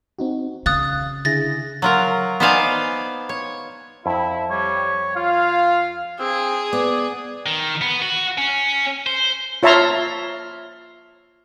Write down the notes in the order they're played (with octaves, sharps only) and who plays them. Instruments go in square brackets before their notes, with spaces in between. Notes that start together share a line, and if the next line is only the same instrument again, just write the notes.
[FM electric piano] C4 D#4 F#4
[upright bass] C#3 [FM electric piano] F5 [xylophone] D#6 F#6 A6
[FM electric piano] D3 E4 G#4 [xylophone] A6 A#6
[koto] F#3 F4 A#4
B3 D#4 C5 D5 F5 G#5
C#5
[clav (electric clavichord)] F2 [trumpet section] E4
[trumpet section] G3 [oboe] C#5
[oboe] F4 [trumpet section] F5
[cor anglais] C4 [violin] G#4
[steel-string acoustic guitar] B3 [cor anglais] D5
[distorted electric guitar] D#3
B3
F#4
C#4
C5
[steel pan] F4 C#5 E5 A5 A#5 C6